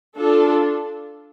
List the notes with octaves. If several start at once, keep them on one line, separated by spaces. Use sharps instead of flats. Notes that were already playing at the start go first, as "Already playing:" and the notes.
D4 F4 A4